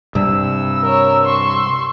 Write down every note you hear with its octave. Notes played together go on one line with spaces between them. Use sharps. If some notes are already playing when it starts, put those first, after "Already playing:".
C2 G2 E6
A#4 C#5
C6 C#6